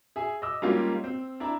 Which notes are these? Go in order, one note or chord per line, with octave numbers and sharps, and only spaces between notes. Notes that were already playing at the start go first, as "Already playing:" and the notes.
G#4 E5 G#5
D#5 D6 E6
G#2 G3 A#3 C#4 F4 G4
C4
D4 E4 D5 A#5